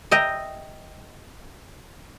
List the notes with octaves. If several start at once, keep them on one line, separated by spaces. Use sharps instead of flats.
D#5 E5 G5 A#5